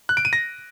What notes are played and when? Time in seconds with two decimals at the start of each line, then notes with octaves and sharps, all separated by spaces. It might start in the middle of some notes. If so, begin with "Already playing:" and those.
0.09 F#6
0.17 D7
0.25 D#7
0.33 A#6